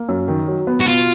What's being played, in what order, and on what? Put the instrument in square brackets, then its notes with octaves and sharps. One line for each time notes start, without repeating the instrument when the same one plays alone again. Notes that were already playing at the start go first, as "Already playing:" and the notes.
Already playing: [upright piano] A#3
F#2
D#3
F#3
B3
[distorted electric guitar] F#4
[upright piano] B2 [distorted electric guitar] F4